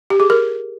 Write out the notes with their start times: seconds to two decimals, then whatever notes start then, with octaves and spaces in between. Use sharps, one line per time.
0.10 G4
0.20 G#4
0.30 A#4